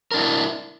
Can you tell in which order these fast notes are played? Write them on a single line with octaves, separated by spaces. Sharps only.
A#4 D4 E4